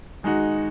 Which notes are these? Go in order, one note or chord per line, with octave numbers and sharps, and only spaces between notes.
D#3 G#3 D#4 F#4